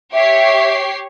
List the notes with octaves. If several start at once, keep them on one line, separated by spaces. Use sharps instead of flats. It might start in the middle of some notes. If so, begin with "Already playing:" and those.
G4 C#5 E5 C7